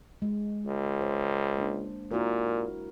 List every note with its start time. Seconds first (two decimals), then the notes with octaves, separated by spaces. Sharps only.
0.22 G#3
0.66 C#2
1.01 C5
1.58 A#3 D4
2.11 A#2 E4 F#4 A#4